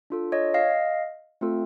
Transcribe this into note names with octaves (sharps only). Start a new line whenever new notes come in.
D4 F4 A4
C#5 D#5
D#5 F5
A3 C4 F4 A4